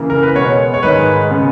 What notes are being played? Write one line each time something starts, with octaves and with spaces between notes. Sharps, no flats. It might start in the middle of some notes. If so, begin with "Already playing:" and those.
Already playing: C#3 E3 A#3
A#4
B4
B2 G#3 B3 C#5
C#5
G#2 D#3 G#3 B4
C#3 G#3 B3